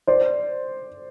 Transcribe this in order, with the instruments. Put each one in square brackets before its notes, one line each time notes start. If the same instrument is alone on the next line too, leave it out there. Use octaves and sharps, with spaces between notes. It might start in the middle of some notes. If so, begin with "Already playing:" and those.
[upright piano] C5 D5